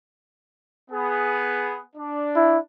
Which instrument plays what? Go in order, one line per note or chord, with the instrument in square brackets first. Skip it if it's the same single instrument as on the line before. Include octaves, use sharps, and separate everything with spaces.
[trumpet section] B3 G#4
D4
[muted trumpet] E4